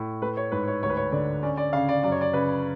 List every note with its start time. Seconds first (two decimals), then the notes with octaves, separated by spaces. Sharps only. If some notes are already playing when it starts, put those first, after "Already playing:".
Already playing: A2
0.22 A3 B4
0.37 C#5
0.52 G#2 B4
0.68 C#5
0.83 D2 C#5
0.90 B4
0.97 C#5
1.12 D3 D5
1.43 C#4 D5
1.57 D5
1.73 C#3 F5
1.89 D5
2.03 F#2 D5
2.12 C#5
2.21 D5
2.33 C#3 B4